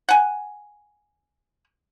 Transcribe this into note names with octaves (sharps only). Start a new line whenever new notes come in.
F#5 G#5